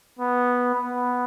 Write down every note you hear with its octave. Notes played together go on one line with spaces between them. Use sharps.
B3
B3